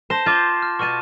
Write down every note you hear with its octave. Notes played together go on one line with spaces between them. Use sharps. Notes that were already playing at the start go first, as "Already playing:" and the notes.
C5 A5 A#6 E7
F4 C6 D6 G6
F6
B2 A5 C#6 F6 D#7